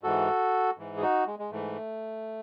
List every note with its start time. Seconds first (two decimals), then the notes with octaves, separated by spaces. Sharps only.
0.03 G#2 E3 F#4 A4
0.78 G#2 E3
0.97 G#4
1.02 D#4 F#4
1.27 G#3
1.39 G#3
1.51 G#2 E3 A3